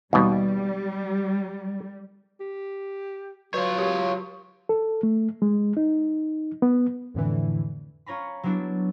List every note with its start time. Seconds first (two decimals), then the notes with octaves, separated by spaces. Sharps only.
0.13 D#2 B2 G3
2.40 G4
3.54 F#3 F4 B4 C#5
3.78 G4 F5 C#6
4.69 A4
5.03 A3
5.42 G#3
5.77 D#4
6.62 B3
7.14 F2 A2 D3 E3
8.06 C#4 F4 C#5 A#5 B5
8.43 F#3 G3 B3 D4 E4